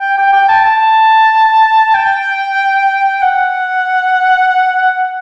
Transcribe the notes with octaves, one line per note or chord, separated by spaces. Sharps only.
G5
G5
G5
A5
A5
G5
F#5